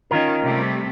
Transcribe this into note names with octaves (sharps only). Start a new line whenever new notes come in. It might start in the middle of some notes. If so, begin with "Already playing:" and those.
D#3 C#4 F4 A#4
C3 G3 A3